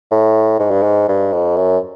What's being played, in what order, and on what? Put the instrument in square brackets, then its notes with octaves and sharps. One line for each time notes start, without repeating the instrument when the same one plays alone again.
[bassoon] A2
G#2
G2
G#2
G2
F2
F#2